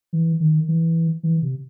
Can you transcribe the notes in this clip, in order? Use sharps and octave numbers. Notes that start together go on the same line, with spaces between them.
E3
D#3
E3
E3
C3